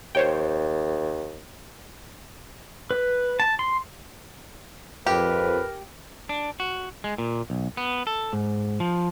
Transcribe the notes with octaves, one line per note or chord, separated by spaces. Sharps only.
D#2 C5 C#5 G5
B4
A5
C6
F2 G4 A#4 B4
D4
F#4
G#3
A#2
B1
B3
A4
G#2
F3